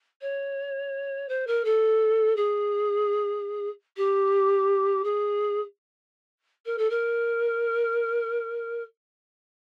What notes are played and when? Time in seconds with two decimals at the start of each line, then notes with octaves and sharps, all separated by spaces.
0.21 C#5
1.28 C5
1.47 A#4
1.64 A4
2.36 G#4
3.97 G4
5.04 G#4
6.66 A#4
6.78 A4
6.90 A#4